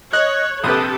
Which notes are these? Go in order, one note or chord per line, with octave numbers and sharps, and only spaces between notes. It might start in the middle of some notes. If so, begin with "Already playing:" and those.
C#5 D#5 F#6
A#1 C3 G4 A4 B4 D#6